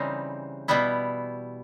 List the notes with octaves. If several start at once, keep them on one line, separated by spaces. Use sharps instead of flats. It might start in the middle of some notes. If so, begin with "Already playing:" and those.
Already playing: C#3 E3 G3 C4 D#4
B2 G3 B3 E4